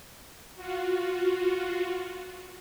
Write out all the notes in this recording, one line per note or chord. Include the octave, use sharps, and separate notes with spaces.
F4 F#4